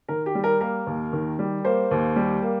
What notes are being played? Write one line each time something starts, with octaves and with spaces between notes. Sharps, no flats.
D#3 A#4
G4
G3
A#4
A#3 A#4
D#2
D#3
G3
A#3 C5
D#2
G3
A#3